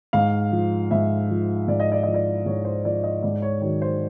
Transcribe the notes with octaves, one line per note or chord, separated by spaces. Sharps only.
G#2 F5
F3
G#2 E5
F3
G#2 D5
D#5
D5
F3 D#5
D5
G#2 C#5
C5
F3 D5
D#5
G#2 D5
C#5
D#3 F#3 C#5
C5